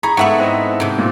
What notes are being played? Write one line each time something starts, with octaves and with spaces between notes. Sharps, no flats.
G#4 A#5 B5 C#6
G#2 A3 B3 A4 E5 F#5 C#6
C4 E4 D#5
G#2 C3
A#2